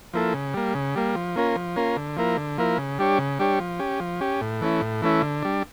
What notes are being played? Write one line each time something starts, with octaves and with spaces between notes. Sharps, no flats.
F3 A#3 E4 A4
C#3
G3 A#3
C#3
G3 A#3
F3
A#3 C#4 F4 A#4
F3
A#3 C#4 F4 A#4
D3
F3 A#3 E4 A#4
D3
F3 A#3 E4 A#4
C#3
G3 D4 G4 C#5
C#3
G3 D4 G4 C#5
F3
C#4 G4
F3
C#4 G4
A2
E3 A3 C#4 E4
A2
E3 A3 C#4 E4
D3
G3 D4